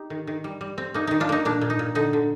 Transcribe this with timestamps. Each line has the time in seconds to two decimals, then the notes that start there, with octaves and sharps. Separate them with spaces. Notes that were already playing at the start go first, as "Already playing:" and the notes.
Already playing: D#4 G4
0.10 D#3
0.27 D#3
0.44 G3
0.61 G3
0.78 C4
0.94 A#3 D#4
1.07 D#3 D#4
1.20 D4 F4
1.29 A#3 D#4
1.45 A#2 D4
1.61 A#2
1.70 D#4
1.79 A#2
1.95 D3 D#4
2.13 D3